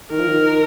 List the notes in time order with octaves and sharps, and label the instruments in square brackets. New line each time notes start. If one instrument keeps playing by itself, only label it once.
[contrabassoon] D#3 [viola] A#4
[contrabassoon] F3
D#3